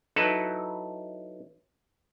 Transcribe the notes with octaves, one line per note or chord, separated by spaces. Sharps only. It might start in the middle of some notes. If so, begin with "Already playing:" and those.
F#3 D#4 E4 A4 B4